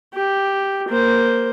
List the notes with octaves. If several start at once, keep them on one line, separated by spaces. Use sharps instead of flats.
G4
A#3 C5